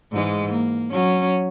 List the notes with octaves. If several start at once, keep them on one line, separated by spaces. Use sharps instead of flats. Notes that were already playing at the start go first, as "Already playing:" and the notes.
G#2 E3 G#3
A#3
F#3 C#4